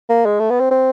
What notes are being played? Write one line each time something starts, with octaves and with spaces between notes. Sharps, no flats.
A#3
G#3
A3
B3
C4
C4